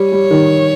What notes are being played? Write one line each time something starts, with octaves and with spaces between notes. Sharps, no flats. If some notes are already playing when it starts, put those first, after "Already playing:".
Already playing: G3 C#5
G3
D#3